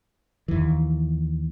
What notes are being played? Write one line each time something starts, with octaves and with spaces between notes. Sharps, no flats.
D#2 E3